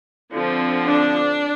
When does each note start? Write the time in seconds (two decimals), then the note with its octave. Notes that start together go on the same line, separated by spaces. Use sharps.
0.34 D3 F3 C4
0.85 D4